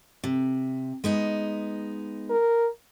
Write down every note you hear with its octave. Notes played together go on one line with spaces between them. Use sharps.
C3
G#3 B3 D#4
A#4